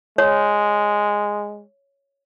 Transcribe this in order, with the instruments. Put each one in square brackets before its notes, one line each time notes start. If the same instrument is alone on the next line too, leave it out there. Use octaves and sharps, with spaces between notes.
[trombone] G#3 [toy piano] C#5